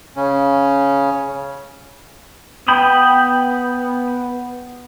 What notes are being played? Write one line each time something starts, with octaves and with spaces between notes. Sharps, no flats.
C#3 C#4
B3 G5 B5 D#6